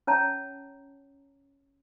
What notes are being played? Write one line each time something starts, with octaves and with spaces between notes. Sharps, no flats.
C#4 C#5 A5 A#5